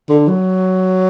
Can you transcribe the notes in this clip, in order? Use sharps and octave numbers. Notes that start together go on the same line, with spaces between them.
D3
F#3